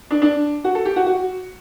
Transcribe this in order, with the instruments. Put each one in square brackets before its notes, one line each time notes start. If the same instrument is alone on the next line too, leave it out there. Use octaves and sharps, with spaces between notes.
[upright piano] D4
D4
F#4
A4
G4
F#4
F#4